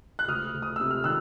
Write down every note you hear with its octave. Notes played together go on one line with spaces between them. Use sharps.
F#6
D2 D#6 F6
D2
D#6
C3 E6
F6
D#3 E6 F#6